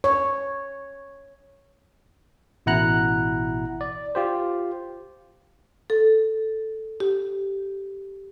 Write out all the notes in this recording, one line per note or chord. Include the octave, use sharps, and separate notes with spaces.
C#5
A1 B2 E4 F#5 A#5 F#6
D5
F4 G4 C5
A4
G4